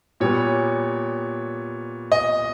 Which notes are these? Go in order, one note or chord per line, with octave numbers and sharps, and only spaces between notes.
A#2 G3 B3 C#5
D#5